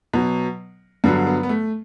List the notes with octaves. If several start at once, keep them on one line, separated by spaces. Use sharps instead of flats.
B2 F#3
G2 D3 F#3 B3
B3
B3
A3